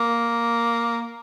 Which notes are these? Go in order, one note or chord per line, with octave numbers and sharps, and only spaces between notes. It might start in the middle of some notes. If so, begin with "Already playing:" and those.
Already playing: A#3